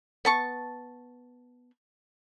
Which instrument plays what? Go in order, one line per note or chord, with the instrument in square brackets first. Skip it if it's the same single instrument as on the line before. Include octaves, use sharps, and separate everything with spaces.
[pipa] B3 A5 C#6